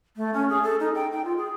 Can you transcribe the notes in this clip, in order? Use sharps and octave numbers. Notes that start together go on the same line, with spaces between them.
A3
C#4
G#4
A4
D#4
G5
G5
F4
G#4